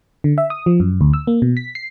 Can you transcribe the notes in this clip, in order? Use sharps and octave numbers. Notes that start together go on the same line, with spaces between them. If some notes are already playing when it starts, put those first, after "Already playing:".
D3
E5
D#6
F3
F#2
D2
E6
A#3
B2
B6
C7